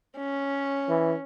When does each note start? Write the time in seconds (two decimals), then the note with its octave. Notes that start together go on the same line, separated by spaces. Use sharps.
0.18 C#4
0.89 E3